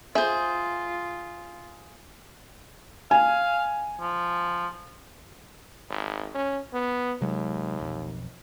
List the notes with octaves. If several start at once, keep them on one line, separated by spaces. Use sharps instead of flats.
F4 G#4 C5 E5
F5 G#5
F3
G#1
C#4
B3
D#2 C3 F#3 G#3
B1 F2